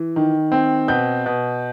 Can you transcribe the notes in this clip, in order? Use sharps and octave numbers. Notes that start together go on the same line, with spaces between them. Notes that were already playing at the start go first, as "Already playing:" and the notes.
Already playing: E3
D#3
C4
B2 G6
B2